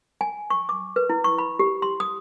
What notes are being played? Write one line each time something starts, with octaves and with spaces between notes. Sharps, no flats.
G#5
C#6
D6
B4
E4
C#6
B5
G4
C6
D#6